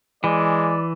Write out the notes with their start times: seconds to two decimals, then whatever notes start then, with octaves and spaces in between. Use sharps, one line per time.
0.24 E3 G#3 D5